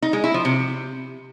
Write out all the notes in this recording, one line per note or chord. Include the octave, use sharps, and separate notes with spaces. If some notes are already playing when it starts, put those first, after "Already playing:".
D#4
G#3
E4
F3
C3